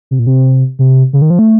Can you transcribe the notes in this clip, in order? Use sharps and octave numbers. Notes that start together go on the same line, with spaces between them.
C3
A#2
C3
C3
C#3
D#3
F3
A3